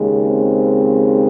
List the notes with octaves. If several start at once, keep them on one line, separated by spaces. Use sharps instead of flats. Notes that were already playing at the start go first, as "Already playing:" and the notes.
Already playing: D#2 C#3 G#3
C4